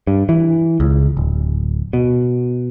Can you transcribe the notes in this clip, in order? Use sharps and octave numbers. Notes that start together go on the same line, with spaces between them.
G2
E3
C#2
D1
B2